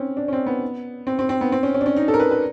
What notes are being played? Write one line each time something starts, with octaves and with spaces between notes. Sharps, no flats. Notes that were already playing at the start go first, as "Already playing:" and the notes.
Already playing: C4 C#4
D4
C#4
C4
B3
C4
C4
C4
B3
C4
C#4
C#4
D4
C#4
D#4
A4
A#4
B4
B4